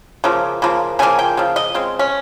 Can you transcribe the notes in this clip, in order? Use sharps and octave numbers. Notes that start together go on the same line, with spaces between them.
C#3 F3 A#3
C#3 F3 A#3
C#3 F3 A#3 G#5
G5
C#3 F3
D#5
C#3 G#3 C4
C#4